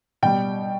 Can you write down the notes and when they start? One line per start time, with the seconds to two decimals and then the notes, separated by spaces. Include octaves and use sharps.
0.23 B2 G3 G5